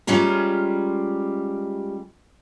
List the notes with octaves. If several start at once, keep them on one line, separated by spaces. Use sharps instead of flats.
G3 G#3 C#4 F4 A#5